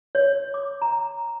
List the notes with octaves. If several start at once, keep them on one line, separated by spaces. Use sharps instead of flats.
C#5
D6
A#5